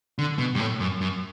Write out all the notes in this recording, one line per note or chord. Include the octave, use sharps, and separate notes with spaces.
D3
B2
G2
A2
F#2
F#2